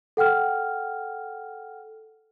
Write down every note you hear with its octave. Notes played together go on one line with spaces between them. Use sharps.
A4 F#5 G5 F6